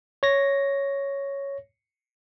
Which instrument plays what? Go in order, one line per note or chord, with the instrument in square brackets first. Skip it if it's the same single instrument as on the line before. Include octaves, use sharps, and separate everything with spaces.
[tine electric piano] C#5 A#6